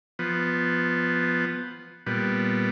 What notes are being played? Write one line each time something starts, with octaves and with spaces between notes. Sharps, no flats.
F3 B3
A#2 G3 B3